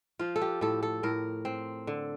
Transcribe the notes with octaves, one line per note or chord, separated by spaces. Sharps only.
F3 F4
A4
G4
A2 A4
A4
A2 A#4
C4
D3